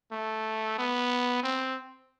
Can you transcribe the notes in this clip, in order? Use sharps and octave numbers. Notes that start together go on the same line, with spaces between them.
A3
B3
C4